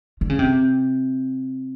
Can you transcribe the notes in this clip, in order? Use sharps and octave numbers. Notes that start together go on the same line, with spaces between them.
D3
C#3
C3